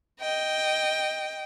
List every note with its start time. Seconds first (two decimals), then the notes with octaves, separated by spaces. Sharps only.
0.20 D#5 G5